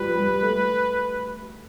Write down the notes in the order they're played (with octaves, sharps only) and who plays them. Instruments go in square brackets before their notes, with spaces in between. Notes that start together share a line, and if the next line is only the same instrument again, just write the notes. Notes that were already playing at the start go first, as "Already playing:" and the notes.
Already playing: [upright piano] F3 G3 [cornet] B4
[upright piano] G3
A3